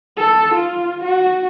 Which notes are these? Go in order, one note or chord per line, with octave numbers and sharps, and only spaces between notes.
A4
F4
F#4